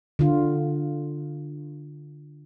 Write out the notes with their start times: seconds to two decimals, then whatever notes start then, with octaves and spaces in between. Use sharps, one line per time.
0.19 D3 F4